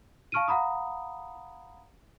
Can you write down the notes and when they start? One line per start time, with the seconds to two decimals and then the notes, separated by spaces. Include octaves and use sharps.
0.32 F5 A5 C#6 F6 D7 D#7
0.48 F5 F#5 A#5 B5 D#6